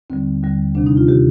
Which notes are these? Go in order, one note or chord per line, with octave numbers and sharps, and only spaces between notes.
D#2 D3 G3 C4
D#2 D3 G3
D2 C3 D#3 D4
D#4
F4
C3 D#3 G4